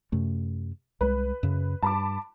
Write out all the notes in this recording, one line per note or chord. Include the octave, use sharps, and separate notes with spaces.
F#2 C3 A3
C2 G#3 B4
F#2 C#3
G2 A5 B5 D6